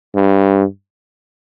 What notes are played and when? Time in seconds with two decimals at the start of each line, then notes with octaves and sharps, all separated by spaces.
0.15 G2